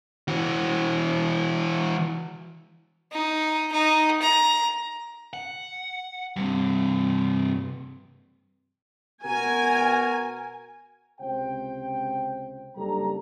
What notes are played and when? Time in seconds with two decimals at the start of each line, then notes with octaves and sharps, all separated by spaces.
0.28 E3 F#4
3.12 D#4
3.72 D#4
4.21 A#5
5.33 F#5
6.36 G2 C3
9.25 B2 F#4 A#4 G#5
11.20 C#2 C3 C5 G5
12.76 F#1 G3 D4 G4 A4 A#5